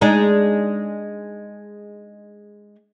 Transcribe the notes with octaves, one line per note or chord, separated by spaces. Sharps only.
G#3 D4 D#4